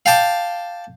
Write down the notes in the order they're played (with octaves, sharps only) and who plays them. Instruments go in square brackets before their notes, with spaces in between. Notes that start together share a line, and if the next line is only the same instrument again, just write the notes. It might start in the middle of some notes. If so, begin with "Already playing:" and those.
[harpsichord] F5 G5 A5 D6